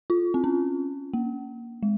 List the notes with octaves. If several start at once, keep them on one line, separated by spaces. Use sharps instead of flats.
F4
C4
C#4
A#3
G#3